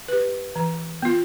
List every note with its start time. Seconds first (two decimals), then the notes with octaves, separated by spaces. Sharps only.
0.08 G4 B4
0.56 E3
1.02 B3 F4